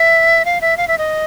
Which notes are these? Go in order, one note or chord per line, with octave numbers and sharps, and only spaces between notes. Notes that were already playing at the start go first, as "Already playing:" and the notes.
Already playing: E5
F5
E5
F5
E5
D#5